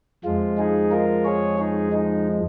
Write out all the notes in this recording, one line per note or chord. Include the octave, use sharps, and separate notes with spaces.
F2 F3 G#3 F4
D#4 G#4
F4 A#4
G#4 C#5
D#4 G#4
D#4